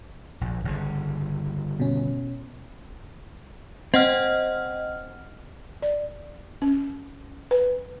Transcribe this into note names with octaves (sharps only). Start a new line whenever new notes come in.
A#1
G1 C#3
B2 C#4
C4 D#5 F#5 F6
D5
C#4
B4